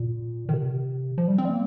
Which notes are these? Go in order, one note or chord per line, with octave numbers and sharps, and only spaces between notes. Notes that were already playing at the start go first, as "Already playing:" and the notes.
Already playing: A#2
D#3
C3
F3
G3
C4
G3
A#3